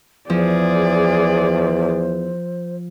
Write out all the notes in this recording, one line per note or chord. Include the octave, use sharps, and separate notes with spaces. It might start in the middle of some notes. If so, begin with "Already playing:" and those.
E2 F3 G#4 C5 D5